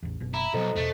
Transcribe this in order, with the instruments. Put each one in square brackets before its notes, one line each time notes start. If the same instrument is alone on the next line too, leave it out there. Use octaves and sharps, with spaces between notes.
[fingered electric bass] A1 E2
F#1 B2
[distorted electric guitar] E4 [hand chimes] A#5
[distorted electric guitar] B1 [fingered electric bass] B2 F#3 [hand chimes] A4 C5 D#5
[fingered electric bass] E2 B2 [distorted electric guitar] A3